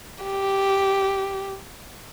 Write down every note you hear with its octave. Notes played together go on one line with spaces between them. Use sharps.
G4